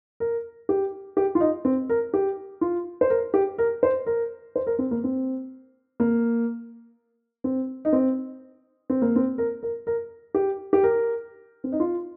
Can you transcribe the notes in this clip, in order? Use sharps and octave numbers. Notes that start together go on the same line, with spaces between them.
A#4
G4
G4
F4
D#4
C4
A#4
G4
F4
C5
A#4
G4
A#4
C5
A#4
C5
A#4
C4
A#3
C4
A#3
C4
D#4
C4
C4
A#3
C4
A#4
A#4
A#4
G4
G4
A#4
C4
D#4
F4